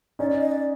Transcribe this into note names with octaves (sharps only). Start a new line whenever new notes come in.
C#4 D#4 D5
D5
D#5
D5